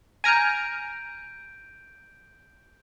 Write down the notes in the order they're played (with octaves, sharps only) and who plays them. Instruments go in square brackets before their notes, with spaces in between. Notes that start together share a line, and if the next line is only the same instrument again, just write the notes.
[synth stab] G#5 A#5 F6 [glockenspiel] G6 D7 D#7